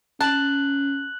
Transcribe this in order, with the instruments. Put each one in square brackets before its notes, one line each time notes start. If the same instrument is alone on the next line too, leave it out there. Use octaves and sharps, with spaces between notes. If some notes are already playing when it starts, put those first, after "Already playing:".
[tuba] C#4 [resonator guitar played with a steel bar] A5 [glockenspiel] F#6 F#7